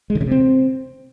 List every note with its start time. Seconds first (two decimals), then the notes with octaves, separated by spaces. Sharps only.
0.10 G#3
0.15 D3
0.21 C#3
0.26 C3
0.31 C4